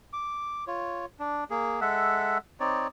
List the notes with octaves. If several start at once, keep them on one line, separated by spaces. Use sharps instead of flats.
D6
F4 C#5
D4
A#3 G#4
G#3 A4 E5 F#5
C4 D#4 C#5 D5